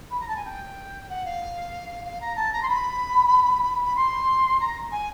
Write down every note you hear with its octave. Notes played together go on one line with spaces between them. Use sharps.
B5
A#5
A5
G#5
G5
F#5
F5
F5
A#5
A5
A#5
C6
B5
B5
C6
A#5
G#5